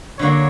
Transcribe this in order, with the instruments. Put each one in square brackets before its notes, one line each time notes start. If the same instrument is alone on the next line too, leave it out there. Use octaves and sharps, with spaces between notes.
[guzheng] D3 F#3 A#3 [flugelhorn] C#5